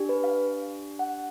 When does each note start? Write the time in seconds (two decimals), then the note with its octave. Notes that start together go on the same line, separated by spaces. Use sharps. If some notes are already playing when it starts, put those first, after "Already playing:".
Already playing: D4 G4
0.09 B4
0.24 F5
0.99 F#5